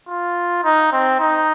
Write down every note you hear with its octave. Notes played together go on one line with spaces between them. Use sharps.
F4
D#4
C4
D#4